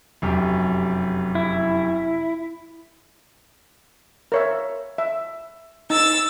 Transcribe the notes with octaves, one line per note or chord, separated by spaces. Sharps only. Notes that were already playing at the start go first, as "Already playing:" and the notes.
F1 F#2 G4
E4
A#4 C#5 E5
E5
D#4 E6 A6